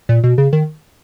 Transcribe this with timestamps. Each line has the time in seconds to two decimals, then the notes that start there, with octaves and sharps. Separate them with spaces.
0.09 A#2
0.24 B2
0.38 C#3
0.53 D#3